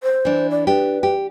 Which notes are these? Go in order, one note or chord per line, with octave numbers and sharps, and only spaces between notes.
C5
E3 D4
D5
D4 G4 B4
G4